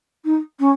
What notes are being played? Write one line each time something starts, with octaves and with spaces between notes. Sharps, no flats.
D#4
C#4